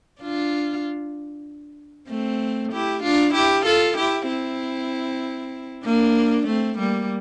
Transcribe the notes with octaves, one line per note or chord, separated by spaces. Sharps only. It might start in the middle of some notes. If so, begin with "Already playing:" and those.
D4 F4
A3 C4
E4 G4
D4 F4
E4 G4
F4 A4
E4 G4
C4 E4
A#3 D4
A3 C4
G3 A#3